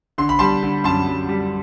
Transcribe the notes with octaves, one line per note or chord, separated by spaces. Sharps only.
D3 C6
B5
G3 A5 C6
D3
F#2 A5 C6
F#2
G3